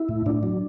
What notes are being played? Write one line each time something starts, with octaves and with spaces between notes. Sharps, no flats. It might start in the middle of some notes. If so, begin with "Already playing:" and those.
Already playing: E4
A2
A2 D4
F#3